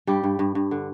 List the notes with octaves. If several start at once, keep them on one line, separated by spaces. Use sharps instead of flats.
G2 G3 G4
G2
G2
G2
D3